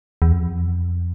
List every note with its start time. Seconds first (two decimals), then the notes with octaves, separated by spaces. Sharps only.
0.22 E2
0.32 F2